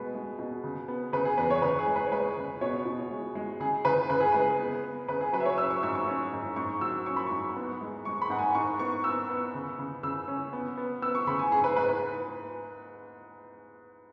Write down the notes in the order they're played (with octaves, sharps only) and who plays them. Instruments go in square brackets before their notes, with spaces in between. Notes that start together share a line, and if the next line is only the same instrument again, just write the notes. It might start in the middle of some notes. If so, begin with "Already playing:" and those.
Already playing: [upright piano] B2 G#3 B4
G#3
B2
C#3
B3
C#3 B4
G#4
E2 B4
C#5
C#3 B4
G#4
G#3
B4
C#5
G#3 B4
C#3
B2 C#5
B2
G#3
G#3
C#3 G#4
C#3 B4
C#3 B4
G#4
G#3 B4
B3
B3
C#3 B4
G#4
F#3 B4
E5
C#5
C#4 E6
C#6
G#2 E6
C#6
C#4
G#2
G#2 C#6
F#3 E6
C#4 C#6
B5
G#2 C#6
B3
G#3
G#3 C#6
B5
G#2 F#5
G#5
G#2 C#6
B3 C#6
B3 E6
B3
C#3
C#3
C#3 E6
C#4
B3
B3
B3 E6
C#6
C#3 B5
G#5
G#2 G#4
B4
G#2 B4
B4